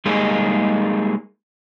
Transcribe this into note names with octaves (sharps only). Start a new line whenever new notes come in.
G3 G#3 A#3 D#4 G#4